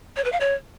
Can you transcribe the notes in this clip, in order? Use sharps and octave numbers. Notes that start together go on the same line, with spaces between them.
C#5
B4
F5
C#5